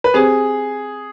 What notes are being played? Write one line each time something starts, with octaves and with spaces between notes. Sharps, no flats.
B4
C4 G4 G#4 C5